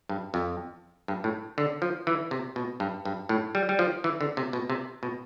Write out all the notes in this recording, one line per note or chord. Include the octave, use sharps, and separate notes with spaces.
G2
F2
G2
A2
D3
F3
E3
C3
B2
G2
G2
A2
G3
G3
F3
E3
D3
C3
B2
C3
B2